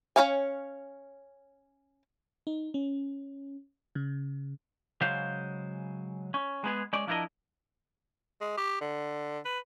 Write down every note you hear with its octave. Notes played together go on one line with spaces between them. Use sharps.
C#4 A4 C#5 F5 G#5
D#4
C#4
C#3
C#3 F#3 G#3 C5 F5
C#4
G#3 B3 G#4
G#3 C#4 D5
F3 D4 E4 G4 A#4 D#5
G#3
G4
D3
B4